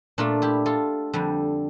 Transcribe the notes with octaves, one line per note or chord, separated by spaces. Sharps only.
A#2 A3 D4 F4
E4 G4
F4 A4
F2 D3 G3